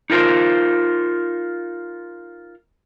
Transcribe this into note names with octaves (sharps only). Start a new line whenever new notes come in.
D#4 F4 A#4 C5